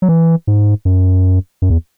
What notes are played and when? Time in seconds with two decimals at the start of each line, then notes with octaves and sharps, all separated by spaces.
0.02 F#3
0.09 E3
0.47 G#2
0.85 F#2
1.62 F#2
1.70 E2